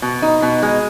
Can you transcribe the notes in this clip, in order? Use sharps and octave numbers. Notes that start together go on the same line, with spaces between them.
B2
D#4
B2
G#3